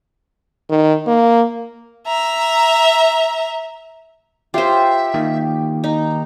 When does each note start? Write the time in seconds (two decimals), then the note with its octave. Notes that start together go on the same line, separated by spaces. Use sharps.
0.70 D#3
1.07 A#3
2.07 E5 A#5
4.54 F4 G4 C5 C#5 E5
5.14 D#3 A#3
5.84 D#4 A#5